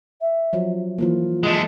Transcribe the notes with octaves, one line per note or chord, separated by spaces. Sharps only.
E5
F3 F#3
E3 F3 A#3 F4
G#3 A3